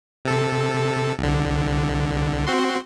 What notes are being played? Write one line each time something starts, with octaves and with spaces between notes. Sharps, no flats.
C3 A4
C2 D3
C4 F#4 C6